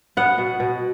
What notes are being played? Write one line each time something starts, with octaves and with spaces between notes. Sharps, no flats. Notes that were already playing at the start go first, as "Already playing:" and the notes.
B3 F#5
B2
B2